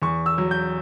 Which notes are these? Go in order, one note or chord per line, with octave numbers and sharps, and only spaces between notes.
E2 C#6
E6
F#3
G6